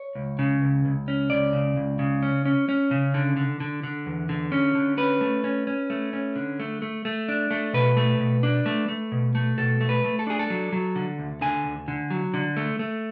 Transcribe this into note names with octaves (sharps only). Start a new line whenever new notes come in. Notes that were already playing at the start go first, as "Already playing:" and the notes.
Already playing: C#5
C#2
C#3
C#2
C#2
C#4
C#2 D5
C#3
C#2
C#3
C#4
C#4
C#4
C#3
D3
D3
D3
D3
E2
D3
C#4
D3
C#4 B4
A3
C#4
C#4
A3
C#4
D3
A3
A3
A3
D4
A3
B2 B4
A3
B2
D4
A3
A3
B2
A3
B2 A4
A3
B4
A3
A4
D4 G#4
A4
F#3
F#3
D3
D2
D3 G#5
D2
D3
F#3
D3
A3
A3